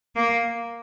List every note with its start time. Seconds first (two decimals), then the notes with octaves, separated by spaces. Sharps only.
0.16 A#3